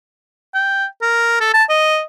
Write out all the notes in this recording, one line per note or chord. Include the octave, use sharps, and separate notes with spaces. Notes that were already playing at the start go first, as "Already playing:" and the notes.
G5
A#4
A4
A5
D#5